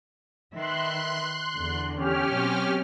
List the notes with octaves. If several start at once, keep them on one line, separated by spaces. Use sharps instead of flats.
D#3 B4 E5 C6 F#6
E2 D3
C#4 G4 F6
B2 F#3 C4